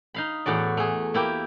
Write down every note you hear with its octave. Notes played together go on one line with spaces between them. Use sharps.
D#4 F5 B5
E2 A2 F#4 D5
A3 G#4
A#3 E4 G4 G5